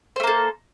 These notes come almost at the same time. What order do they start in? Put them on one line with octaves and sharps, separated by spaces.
C5 A3 A#3 A4